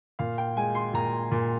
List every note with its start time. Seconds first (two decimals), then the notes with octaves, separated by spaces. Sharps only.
0.19 A#2 F5
0.38 G5
0.57 G#3 G#5
0.75 C6
0.94 A#2 A#5
1.31 A#2